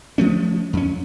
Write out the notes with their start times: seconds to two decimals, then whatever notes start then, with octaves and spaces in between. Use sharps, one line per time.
0.18 F3 A3 C#4
0.73 F2 C#4